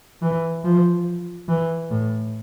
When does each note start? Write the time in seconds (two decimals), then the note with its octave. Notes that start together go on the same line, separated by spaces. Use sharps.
0.22 E3
0.64 F3
1.48 E3
1.91 A2